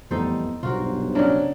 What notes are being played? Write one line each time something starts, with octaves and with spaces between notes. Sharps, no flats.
F2 A2 E3 G3 B3 D#4 A4 C5
B1 G2 B2 F4 F#4 A#4 C5
C#3 F#3 C#4 D4 A#4